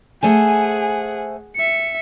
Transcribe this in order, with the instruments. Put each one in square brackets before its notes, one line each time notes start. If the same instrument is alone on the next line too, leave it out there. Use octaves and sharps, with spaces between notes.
[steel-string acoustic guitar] A3 C5 G#5 [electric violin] G#4 F#5
[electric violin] E5 C#7